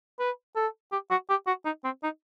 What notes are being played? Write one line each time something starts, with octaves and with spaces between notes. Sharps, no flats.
B4
A4
G4
F#4
G4
F#4
D#4
C4
D#4